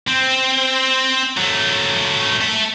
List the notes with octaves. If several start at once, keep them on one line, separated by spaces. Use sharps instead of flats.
C4
F#3 A3
A4 E5